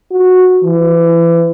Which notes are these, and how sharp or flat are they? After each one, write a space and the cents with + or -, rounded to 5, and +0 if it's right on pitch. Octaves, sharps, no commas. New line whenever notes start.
F#4 -10
E3 +30